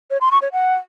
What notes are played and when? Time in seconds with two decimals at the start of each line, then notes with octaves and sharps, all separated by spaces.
0.10 C#5
0.21 C6
0.31 C#6
0.42 C#5
0.52 F#5